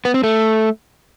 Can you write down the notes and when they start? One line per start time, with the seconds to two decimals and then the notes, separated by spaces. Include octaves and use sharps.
0.05 B3
0.14 C4
0.24 A3